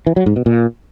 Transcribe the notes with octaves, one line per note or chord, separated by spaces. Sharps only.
E3
F#3
G#2
B2
A#2